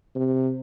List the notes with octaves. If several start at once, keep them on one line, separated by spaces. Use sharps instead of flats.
C3